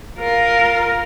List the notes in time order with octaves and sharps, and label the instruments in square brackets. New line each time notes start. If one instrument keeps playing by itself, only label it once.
[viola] F4 A#4